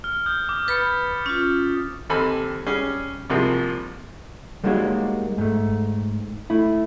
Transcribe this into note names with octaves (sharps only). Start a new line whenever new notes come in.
F6
D#6 G6
D6
B4 B5 A6 B6 C#7
C#4 F4
D#2 C4 A4 G#5 B5
G3 C#4 G#4
C2 C3 F3 A#3 C4 G#4
G3 G#3 A#3 D#4 F#4 C#5
G#2 A3
A3 E4